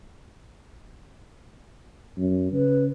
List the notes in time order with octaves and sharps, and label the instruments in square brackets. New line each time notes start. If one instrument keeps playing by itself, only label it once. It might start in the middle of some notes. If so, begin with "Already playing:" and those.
[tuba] F#2
[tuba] C#3 [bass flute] B4